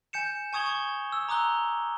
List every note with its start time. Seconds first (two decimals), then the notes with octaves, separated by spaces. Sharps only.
0.13 G#5 G6 C#7 E7
0.53 G#5 C#6 D#6 G#6 F7 G7
0.66 C#6 G#6
1.12 E6
1.29 A#5 D6 D#6 F#6 G7